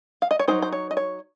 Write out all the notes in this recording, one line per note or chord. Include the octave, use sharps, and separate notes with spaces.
F5
D#5
C#5
F#3 C4 D#4 C5
C5
C#5
D#5
C#5